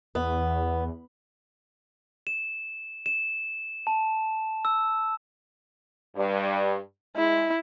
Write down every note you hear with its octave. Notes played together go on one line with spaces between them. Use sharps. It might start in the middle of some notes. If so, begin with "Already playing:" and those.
E2 B3
E7
E7
A5
E6
G2 G3
G#3 E4